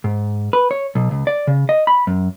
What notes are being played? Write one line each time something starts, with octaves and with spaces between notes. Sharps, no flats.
G#2
B4
C#5
B1
C#2
D5
C#3
D#5
B5
F#2